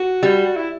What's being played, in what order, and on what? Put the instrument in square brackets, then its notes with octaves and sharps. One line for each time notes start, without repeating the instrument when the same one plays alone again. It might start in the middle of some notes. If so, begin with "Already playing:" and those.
Already playing: [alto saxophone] F#4
[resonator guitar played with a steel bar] G3
[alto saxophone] E4